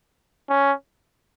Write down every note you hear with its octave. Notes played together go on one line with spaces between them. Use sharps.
C#4